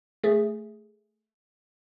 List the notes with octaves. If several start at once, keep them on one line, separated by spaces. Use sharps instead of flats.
A3 G#4